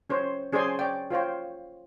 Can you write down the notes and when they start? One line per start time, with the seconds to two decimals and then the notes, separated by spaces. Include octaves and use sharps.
0.10 C#4 C5 C#5
0.52 C#4 G#4 C5 D5 G#5 C6
0.79 C#5 D5 G5
1.10 F4 C5 C#5 G5